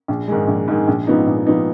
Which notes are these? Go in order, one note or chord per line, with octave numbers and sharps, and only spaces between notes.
A#1
G#2 D#3 G#3
A#1
G#2 D#3 G#3
A#1
G#2 F3 B3 D#4
A#1
F3 B3 D#4